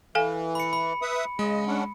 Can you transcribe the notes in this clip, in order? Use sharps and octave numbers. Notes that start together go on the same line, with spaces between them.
E3 A4 F5 G#5
B5 C#7
B5
B4 E5 D#6
C#3 G#3 D#5
C#4 D4 F#5